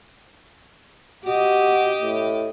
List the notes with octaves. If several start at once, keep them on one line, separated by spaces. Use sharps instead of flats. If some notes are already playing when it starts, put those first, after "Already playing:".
F#4 G4 D#5
A2